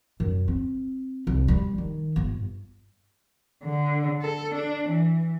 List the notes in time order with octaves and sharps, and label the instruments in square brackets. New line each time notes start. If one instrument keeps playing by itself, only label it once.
[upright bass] F#2
C4
C2
G3
D#3
G1
[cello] D3
A4
D4
E3